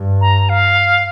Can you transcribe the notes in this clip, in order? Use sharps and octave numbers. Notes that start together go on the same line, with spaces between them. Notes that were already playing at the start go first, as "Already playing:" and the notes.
Already playing: G2
A#5
F5